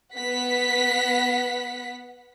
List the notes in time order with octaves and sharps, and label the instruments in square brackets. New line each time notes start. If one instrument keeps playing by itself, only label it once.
[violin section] B3 F#5 B6